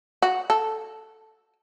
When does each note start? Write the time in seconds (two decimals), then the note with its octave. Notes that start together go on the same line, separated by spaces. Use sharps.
0.22 F#4
0.50 A4